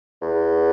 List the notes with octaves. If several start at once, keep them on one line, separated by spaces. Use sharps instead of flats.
E2